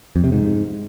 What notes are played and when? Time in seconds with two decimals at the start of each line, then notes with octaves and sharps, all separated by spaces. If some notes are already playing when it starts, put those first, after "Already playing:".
0.16 F2
0.24 C3
0.32 G#2